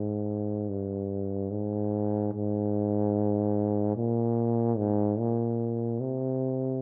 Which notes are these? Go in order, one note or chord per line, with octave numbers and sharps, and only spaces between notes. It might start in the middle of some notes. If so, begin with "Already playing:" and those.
Already playing: G#2
G2
G#2
G#2
A#2
G#2
A#2
C3